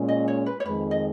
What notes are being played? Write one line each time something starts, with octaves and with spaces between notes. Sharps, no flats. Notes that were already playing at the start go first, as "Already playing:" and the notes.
Already playing: A#2 G#3 C#4
D#5
C#5
B4
C#5
F2 D#3 G#3 B4
D#5